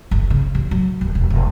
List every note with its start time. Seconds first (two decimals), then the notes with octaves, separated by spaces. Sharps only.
0.11 F#1
0.30 C#3
0.55 A1
0.71 F#3
1.01 D#1
1.15 E1
1.30 F1